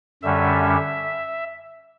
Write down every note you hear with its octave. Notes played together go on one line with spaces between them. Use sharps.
F#2 D3 G3 C#4 E5